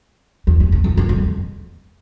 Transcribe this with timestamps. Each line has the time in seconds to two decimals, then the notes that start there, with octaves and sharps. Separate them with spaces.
0.47 E2
0.60 E2
0.72 E2
0.84 F2
0.97 F2
1.09 F2